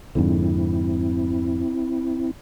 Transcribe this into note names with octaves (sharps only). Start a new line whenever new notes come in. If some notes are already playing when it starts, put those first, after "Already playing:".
F2 G#2 D3 C4 E4